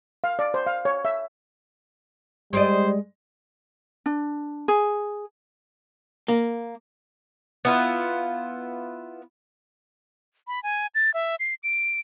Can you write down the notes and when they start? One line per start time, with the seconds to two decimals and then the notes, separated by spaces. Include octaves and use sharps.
0.24 F5
0.39 D5
0.54 C5
0.67 F5
0.85 C#5
1.05 E5
2.53 G3 G#3 C5 D5 D#5
4.06 D4
4.68 G#4
6.28 A#3
7.65 B3 E4 F4
10.47 B5
10.63 G#5
10.95 A6
11.14 E5
11.40 C7
11.63 D7